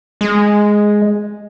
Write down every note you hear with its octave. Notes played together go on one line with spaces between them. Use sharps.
G#3